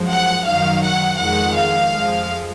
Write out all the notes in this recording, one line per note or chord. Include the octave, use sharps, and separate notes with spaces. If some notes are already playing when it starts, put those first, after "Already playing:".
Already playing: F#2 F3 G#3
F#5
F#2 D#3 F#3 F5
F#5
F2 D#3 G#3 F#5
F5
F2 F3 G#3